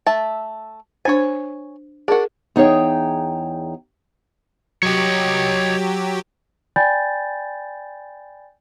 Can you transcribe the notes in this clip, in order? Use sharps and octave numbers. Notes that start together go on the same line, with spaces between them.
A3 E5 A5
D4 C5 C#5 G#5
D4 F#4 G#4 A#4
E2 D#4 G#4 C#5 G5
F#3 G4 C#5 D#5
D5 G5 G#5 B5 G6 A6